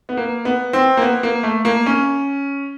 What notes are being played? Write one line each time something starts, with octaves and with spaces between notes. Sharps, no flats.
B3
A#3
B3
C4
A#3
B3
A#3
A3
A#3
C#4